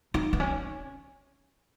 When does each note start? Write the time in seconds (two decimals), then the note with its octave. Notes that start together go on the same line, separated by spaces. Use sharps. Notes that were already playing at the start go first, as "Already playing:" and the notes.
0.14 D#4
0.33 B3
0.40 C#4